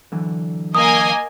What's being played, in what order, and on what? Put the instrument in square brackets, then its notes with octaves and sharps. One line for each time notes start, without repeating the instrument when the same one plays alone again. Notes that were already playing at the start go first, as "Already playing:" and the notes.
[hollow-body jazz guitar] D3 E3 F#3
[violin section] A#3 D#5 G#5 [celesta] D#6